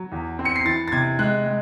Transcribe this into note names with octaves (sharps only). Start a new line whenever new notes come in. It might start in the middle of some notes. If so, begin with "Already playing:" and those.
Already playing: F#3
E2
C4
C#7
C7
E3 A6
A6
C3 G#6
G#3 F#6
G#3